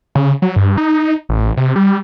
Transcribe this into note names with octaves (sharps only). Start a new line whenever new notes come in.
C#3
F#3
G2
D#4
A1
C3
G3